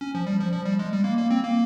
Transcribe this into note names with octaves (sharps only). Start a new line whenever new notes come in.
C#4
F3
G3
F3
F3
G3
G#3
G3
A#3
A#3
C4
A#3